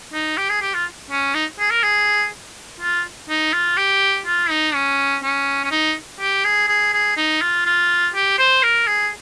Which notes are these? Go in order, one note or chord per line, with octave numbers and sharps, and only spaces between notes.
D#4
G4
G#4
G4
F4
C#4
D#4
G#4
A#4
G#4
F4
D#4
F4
G4
F4
D#4
C#4
C#4
C#4
D#4
G4
G#4
G#4
G#4
D#4
F4
F4
G4
C5
A#4
G#4